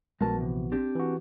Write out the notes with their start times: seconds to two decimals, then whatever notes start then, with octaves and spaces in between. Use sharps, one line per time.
0.21 A#1 G#3 B3 F#4 A#4 A5
0.37 C3 E3
0.72 C4 D4 G4
0.95 E3 F#4